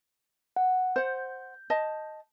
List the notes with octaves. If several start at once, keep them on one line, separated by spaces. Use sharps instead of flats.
F#5
C5 F#5 G6
D#5 A5